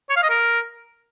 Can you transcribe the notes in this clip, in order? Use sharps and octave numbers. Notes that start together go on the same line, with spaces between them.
C#5
F5
D#5
A#4